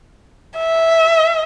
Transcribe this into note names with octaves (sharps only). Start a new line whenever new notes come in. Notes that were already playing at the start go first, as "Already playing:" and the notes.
E5